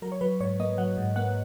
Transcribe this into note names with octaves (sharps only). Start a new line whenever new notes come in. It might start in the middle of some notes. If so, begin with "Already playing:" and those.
F#3 A#4
C#5
F#3 B4
G#2 C#5
A#3 D#5
F#3 F#5
G#2
A#3 F#5